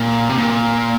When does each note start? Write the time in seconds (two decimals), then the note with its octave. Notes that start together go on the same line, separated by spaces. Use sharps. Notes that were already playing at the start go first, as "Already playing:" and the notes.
Already playing: A#2
0.29 C3
0.38 A#2